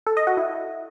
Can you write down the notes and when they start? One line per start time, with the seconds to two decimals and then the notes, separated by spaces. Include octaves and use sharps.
0.07 A4
0.17 D#5
0.27 F#4
0.37 E4